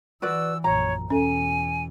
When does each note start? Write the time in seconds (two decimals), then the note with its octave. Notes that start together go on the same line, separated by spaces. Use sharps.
0.22 E3 F#4 B4 D5 E6
0.64 A#1 F#2 C#5 A#5
1.10 E2 B2 C#4 A4 G#5